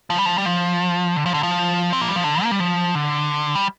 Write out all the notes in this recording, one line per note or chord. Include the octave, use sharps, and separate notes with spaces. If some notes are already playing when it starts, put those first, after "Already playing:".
F3
G3
F3
G3
F3
D3
F3
D3
F3
C4
A#3
G3
F3
D3
A#3
G3
F3
D3
G3